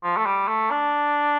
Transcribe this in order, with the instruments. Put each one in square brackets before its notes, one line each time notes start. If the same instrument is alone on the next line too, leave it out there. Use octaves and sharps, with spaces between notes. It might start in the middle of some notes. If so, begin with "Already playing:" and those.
[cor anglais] F3
A3
G3
A3
D4